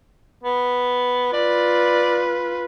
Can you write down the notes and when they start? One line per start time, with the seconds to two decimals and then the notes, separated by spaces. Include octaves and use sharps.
0.43 B3
1.33 F4 B4 D5